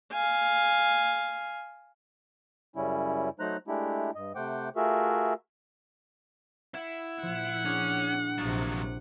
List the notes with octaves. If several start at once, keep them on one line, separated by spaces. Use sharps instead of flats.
F5 G#5
F#2 C#3 G3 C#4 E4
F#3 A3 D#4 C5 A#5 F#6
G#3 A3 D4 E4 G4
G2 D#5
C3 A3 C5 F#5 G5 D6
A3 F4 F#4 G#4 A#4 E5
E4 F#5
A#2 F3 F#5
C#4 D4 E4 G#4
A#1 C3 F3 F#3